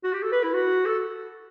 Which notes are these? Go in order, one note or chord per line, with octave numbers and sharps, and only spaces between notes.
F#4
G4
A4
B4
E4
F#4
A4